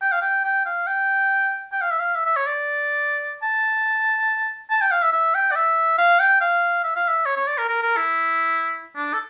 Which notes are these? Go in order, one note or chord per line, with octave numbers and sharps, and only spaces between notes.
G5
F5
G5
G5
F5
G5
G5
F5
E5
F5
E5
E5
C#5
D5
A5
A5
G5
F5
E5
E5
G5
D5
E5
F5
G5
F5
E5
F5
E5
C#5
C#5
D5
A#4
A#4
A#4
E4
D4
A4